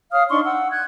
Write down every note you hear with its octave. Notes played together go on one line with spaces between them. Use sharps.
C#5 F5 D#6 F6
D4 D#4 C6 C#6
F#5 E6
F#6 G#6